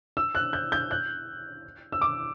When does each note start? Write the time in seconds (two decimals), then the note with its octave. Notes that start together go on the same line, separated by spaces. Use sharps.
0.17 E6
0.35 F#6
0.53 G6
0.72 G6
0.91 F#6
1.92 E6
2.01 D6